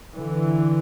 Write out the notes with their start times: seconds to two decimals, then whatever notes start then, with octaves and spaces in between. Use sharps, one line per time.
0.14 D3 E3